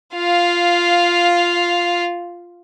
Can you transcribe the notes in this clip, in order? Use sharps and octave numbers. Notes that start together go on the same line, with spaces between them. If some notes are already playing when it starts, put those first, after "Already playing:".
F4 F5